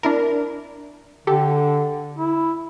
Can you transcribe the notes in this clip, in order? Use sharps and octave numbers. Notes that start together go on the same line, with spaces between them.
D4 E4 A#4
D3 G4 A4
E4